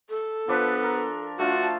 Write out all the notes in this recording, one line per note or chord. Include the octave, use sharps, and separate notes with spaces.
A4
F3 B3 D4 B4
A#4
A3 D4 F4 F#4
A5